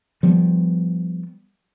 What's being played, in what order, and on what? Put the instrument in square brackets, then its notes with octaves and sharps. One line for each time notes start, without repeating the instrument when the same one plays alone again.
[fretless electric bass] F3 G3 B3